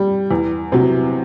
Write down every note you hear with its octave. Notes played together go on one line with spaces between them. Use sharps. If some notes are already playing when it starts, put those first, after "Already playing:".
Already playing: G3
E2
C3 F#3